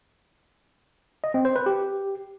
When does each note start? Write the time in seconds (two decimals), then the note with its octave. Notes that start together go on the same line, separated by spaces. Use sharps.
1.24 D#5
1.34 C4
1.45 C5
1.56 B4
1.66 G4